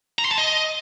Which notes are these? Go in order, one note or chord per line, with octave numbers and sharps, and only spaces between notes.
A#5
C6
A5
D#5